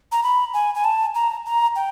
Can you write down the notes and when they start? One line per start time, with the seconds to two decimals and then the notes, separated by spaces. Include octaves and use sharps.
0.12 A#5
0.23 B5
0.54 G#5
0.75 G#5
0.84 A5
1.15 A#5
1.46 A#5
1.76 G5